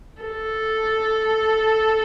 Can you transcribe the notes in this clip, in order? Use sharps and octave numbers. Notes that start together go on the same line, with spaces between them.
A4